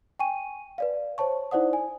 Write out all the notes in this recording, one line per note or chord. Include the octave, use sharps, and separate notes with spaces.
G5 G#5 C#6 D#7
B4 D5 F5
C5 C#5 A5 C#6
D#4 E4 C5 D5 F#5 D#6
G#5